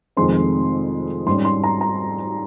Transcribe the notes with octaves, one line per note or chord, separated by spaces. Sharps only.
F1 F2 D#3 G#3 C4 C6
G#2 G3 C#4 C6
C6
A#5
A#5